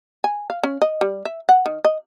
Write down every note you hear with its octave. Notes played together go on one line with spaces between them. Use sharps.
G#5
F5
C#4
D#5
G3
E5
F#5
D#3
D#5